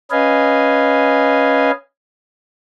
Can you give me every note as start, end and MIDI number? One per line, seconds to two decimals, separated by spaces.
0.11 1.71 61
0.11 1.71 71
0.11 1.71 75
0.11 1.71 77
0.11 1.71 80